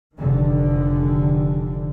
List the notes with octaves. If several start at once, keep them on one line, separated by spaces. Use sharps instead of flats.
F1 D3 D#3